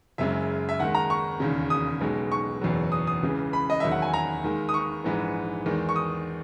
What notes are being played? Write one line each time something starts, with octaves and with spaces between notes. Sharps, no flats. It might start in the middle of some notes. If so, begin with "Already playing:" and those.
F#1 F#2 C#3 G#3 E5
E5
D#2 D#3 G#3 F#5
A#5
C#6
E1 D#2 C#3
D#6
B1 B2 G#3
C#6
F#1 E2 B2 F#3
D#6
D#6
C#2 C#3 E3
B5
D#5
E1 D#2 D#3 F#3 E5
F#5
G#5
A#5
D#2 D#3 G#3
D#6
C#6
A#1 G#2 E3
E2 D#3 G#3
C#6
D#6